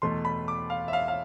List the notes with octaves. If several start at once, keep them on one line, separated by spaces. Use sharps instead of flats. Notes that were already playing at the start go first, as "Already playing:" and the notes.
E2 B2 A3 C6
B5
D6
F5
E5
F5
F5